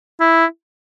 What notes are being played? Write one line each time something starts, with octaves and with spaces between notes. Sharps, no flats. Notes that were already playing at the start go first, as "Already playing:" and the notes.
E4